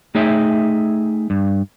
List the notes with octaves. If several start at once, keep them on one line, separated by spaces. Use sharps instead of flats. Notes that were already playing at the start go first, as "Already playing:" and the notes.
A3 D#4 G#4 C#5 E5 G5
G2